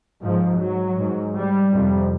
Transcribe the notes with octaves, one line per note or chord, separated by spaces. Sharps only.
G#2 F3
F#3
G#2
G3
F2 C3